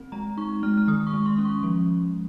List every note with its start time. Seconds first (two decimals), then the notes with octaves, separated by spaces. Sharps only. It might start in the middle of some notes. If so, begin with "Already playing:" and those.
Already playing: C4
0.12 G#3 A#5
0.37 D#4 C#6
0.63 G#3 F6
0.77 F6
0.88 D#3 D#6
1.07 C#6
1.13 G#3
1.26 C6
1.38 C#4
1.45 C#6
1.63 F3